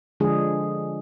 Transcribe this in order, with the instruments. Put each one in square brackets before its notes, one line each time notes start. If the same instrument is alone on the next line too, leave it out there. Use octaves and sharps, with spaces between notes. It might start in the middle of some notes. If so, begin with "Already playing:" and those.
[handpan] D3 F3 G#3 D4 G#4